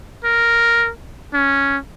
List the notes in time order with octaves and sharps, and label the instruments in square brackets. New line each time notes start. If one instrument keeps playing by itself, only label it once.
[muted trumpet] A#4
C#4